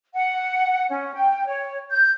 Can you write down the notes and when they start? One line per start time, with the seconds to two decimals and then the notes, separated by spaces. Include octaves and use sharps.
0.14 F#5
0.89 C#4
1.14 G5
1.47 C#5
1.91 G6